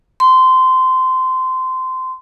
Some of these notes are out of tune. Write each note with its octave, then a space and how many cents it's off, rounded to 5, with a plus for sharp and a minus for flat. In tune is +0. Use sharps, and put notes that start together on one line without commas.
C6 -20